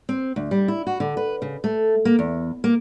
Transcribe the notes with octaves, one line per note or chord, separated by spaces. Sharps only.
C4
D2
G3
E4
F#4
D3
B4
C#3
A3
A#3
E2
A#3